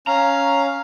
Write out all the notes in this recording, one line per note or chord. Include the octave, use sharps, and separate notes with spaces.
C#4 F5 A#5